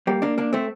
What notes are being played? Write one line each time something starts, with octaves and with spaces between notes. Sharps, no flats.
G3 A#3
A#3 D4
A#3 D4
A3 C4